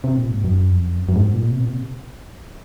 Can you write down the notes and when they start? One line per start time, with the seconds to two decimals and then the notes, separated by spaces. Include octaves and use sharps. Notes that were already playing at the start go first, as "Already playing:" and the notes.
0.04 C3
0.18 A#2
0.31 G#2
0.44 F#2
0.71 F2
0.98 F#2
1.09 F#2
1.16 G#2
1.34 A#2
1.51 C3
1.60 A#2
1.69 C3